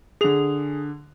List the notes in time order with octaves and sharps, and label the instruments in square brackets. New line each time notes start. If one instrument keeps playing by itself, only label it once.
[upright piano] D3 F7 [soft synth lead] G#4